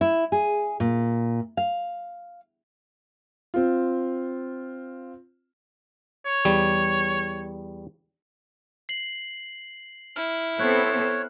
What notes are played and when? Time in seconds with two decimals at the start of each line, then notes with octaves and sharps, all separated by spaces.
0.01 E4
0.32 G#4
0.80 A#2
1.57 F5
3.54 C4 F4
6.26 C#5
6.45 E2 G3
8.89 C7 F#7
10.16 E4 F6
10.60 B3 C4 A4 C#5 F#6